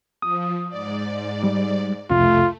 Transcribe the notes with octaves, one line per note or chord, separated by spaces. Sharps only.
F3 D#6
G#2 D5
G3
C2 F2 C3 A3 F4